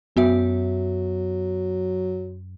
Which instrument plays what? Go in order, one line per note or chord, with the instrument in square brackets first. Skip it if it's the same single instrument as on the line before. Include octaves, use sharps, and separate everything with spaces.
[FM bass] F#2 [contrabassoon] F#3 [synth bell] B3 F#4 E5